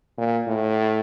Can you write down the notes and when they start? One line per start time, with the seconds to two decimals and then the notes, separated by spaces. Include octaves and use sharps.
0.18 A#2
0.47 A2